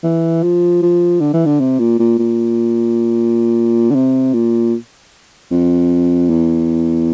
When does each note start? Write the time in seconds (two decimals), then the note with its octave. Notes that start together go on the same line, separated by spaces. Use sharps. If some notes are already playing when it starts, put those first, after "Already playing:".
0.03 E3
0.43 F3
0.82 F3
1.20 D3
1.33 E3
1.45 D3
1.60 C3
1.79 A#2
1.99 A#2
2.18 A#2
3.90 D3
3.95 C3
4.33 A#2
5.51 F2
6.29 E2